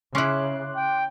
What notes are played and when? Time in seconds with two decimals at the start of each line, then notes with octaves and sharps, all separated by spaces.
0.15 C#3 C#4 E4 C6 D6 F#6
0.75 G5